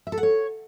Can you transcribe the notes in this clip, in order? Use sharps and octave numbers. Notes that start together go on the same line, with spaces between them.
E5
A4
F#5
C#5